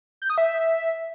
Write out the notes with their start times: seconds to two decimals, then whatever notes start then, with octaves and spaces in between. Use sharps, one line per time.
0.22 G6
0.30 D#6
0.38 E5